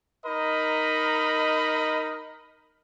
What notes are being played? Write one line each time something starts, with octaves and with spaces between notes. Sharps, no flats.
D#4 A#4 D#5 B5